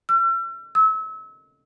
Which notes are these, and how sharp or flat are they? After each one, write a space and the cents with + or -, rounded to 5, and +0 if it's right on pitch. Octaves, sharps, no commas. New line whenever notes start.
E6 +45
E6 -30